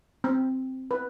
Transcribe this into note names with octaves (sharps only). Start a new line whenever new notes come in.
C4
B4